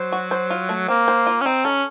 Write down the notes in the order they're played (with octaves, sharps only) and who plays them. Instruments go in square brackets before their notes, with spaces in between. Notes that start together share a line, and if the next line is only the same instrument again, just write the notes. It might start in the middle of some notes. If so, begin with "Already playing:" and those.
Already playing: [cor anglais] F#3 [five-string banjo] C5
[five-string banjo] F#4
C5
F4
A3
[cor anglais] A#3 [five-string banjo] C4
[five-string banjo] C5
F4
[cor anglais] C#4
[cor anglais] C4 [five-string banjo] D#4
[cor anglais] C#4 [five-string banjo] A4